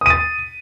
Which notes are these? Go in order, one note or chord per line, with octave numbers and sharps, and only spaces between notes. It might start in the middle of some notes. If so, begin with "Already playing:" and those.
D#6 A6 D#7